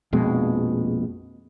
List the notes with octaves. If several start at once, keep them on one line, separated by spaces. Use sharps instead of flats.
A#1 F2 B2 G#3